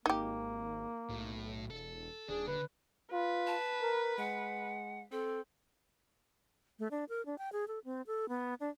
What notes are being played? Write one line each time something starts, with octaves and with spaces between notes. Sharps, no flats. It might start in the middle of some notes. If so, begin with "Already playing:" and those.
G#1 A#3 D#4 G4
B1 A2
E1 A4
D#1 D4 G#4
D3 B4
F4 B4
A5
A#4
G#3 F#5
C4 A4
A3
D4
A#4
D4
G5
G#4
A4
C4
A4
B3
D4